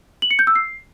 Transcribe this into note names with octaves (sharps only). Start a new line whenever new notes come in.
F#7
C#7
G6
E6
C7